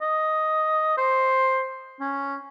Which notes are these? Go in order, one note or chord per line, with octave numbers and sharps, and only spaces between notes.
D#5
C5
C#4